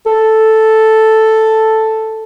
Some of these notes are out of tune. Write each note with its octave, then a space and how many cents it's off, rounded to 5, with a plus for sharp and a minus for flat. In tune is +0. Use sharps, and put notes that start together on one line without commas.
A4 +0